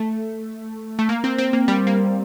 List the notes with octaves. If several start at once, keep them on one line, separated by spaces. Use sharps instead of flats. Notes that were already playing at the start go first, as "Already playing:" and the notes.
Already playing: A3
A3
A#3
C4
C4
A#3
G3
A#3